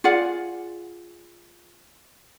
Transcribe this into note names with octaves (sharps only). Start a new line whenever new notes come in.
F4 G#4 D5 F#5